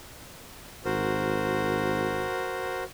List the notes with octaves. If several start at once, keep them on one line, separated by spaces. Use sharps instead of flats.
G#1 F#4 A#4 C5